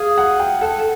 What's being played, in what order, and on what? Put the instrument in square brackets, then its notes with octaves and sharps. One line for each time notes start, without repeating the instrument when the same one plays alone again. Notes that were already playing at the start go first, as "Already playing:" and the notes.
Already playing: [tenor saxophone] G#4 [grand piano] F5
[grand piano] F#5
G5
[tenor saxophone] A4 [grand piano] F#5